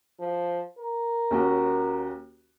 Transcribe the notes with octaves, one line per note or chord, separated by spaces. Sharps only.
F3
A#4
D#2 C#4 F#4